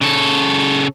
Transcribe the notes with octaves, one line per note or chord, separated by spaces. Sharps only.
C#3 A4